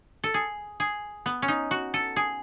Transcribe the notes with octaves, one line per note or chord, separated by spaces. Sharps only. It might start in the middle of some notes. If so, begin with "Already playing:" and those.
A4
G#4
G#4
B3
C#4
D#4
F#4
A4
G#4